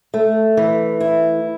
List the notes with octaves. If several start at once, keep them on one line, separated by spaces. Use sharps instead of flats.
A3
E3
E4